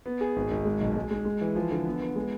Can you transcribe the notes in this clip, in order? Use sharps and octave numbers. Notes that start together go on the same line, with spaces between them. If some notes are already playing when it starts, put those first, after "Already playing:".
B3
G#4
G#1
G#1
G#3
B1
G#3
G#3
G#3
E3
F3
D3
B3
B3
G#3